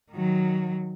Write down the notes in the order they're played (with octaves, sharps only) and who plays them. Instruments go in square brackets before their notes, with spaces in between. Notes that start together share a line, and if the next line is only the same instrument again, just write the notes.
[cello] D#3 F#3